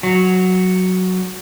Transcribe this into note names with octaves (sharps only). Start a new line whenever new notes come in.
F#3